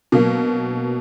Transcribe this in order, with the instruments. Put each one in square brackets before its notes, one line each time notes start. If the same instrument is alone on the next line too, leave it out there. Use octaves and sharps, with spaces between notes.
[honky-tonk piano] B2 F#3 A#3